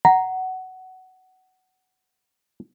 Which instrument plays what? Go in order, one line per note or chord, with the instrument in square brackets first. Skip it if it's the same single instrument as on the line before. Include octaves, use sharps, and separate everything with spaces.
[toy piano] F#5 [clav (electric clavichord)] A#5